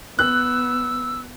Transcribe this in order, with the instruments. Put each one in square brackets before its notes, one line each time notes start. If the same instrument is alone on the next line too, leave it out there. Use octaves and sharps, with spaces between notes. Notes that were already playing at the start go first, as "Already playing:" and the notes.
[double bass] B3 [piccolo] E6 [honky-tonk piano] F#6